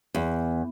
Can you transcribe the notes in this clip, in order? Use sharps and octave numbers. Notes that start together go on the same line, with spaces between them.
E2